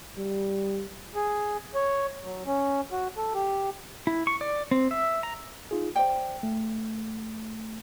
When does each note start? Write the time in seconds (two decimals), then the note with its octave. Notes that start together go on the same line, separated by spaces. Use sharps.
0.18 G3
1.15 G#4
1.75 C#5
2.24 F#3
2.46 C#4
2.92 F#4
3.17 A4
3.34 G4
4.07 E4
4.27 C#6
4.41 D5
4.71 C4
4.91 E5
5.23 A#5
5.71 D#4 F4 G#4
5.96 C5 D5 G5
6.43 A3